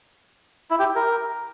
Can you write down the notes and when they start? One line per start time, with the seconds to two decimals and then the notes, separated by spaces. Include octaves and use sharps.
0.71 E4
0.79 G4
0.96 A#4